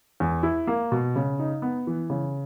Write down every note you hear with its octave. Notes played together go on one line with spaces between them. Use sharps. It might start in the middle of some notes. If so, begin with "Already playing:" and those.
E2
E4
A#3
B2
C#3
D#4
B3
E3
C#3